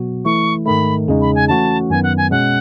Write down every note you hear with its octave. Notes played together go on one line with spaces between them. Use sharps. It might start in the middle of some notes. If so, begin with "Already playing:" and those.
Already playing: B2 F#3 B3 F#4
E3 A3 E4 C#6
G#2 D#3 A3 B5
E2 C#3 G#3 D#4
B5
G#5
E3 A3 C#4 F#4 A5
F#2 D#3 F#3 B3 G#5
F#5
G#5
B2 G#3 C#4 F#5